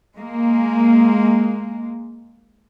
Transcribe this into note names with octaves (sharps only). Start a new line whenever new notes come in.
G#3 A#3